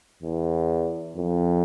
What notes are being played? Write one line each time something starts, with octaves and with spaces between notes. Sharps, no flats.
E2
F2